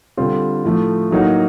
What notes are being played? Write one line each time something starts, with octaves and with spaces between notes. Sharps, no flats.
D3 G3 C4 F4
A2 F3 A3
A2 F#3 A#3 D#4 F#4